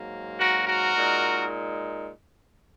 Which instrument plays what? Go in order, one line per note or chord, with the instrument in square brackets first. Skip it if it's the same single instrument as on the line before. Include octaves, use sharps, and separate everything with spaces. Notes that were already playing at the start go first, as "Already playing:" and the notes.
Already playing: [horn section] G#2 F#3 A#3
F#4 A#4
F#4 A#4
A#2 G#3 D#4